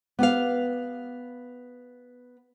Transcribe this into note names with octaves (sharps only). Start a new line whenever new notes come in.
B3 G4 B4 F5